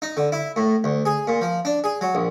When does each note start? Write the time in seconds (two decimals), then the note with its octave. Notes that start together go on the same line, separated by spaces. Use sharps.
0.02 D#4
0.17 D3
0.32 E4
0.56 A2
0.84 D2
1.05 G#4
1.27 A#2
1.41 F3
1.65 D4
1.84 G#4
2.01 F#3
2.15 A#1